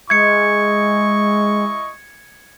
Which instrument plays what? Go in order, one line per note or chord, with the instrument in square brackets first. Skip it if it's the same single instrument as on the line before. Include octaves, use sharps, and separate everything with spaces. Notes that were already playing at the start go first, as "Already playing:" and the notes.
[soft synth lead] G#3 [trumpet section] E4 D#5 C#6 [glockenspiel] G#6 C#7